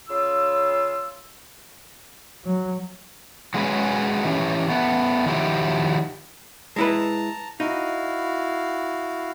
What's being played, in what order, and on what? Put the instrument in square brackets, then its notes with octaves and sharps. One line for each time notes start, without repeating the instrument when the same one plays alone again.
[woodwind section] C#3 F4 E6
[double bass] F#3
[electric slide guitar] F#3 G#3 C#4 G#4 B4
E3 C#4 G4
A3 B3
D#3 F3 F#3 E4 G4
[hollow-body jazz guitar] G#3 E4 B4 [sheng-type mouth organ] A5 A#5
[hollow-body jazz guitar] D#4 [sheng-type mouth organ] E4 F#4 F5